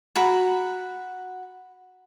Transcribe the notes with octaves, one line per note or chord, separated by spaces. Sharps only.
F#4 F#5 A#5 B5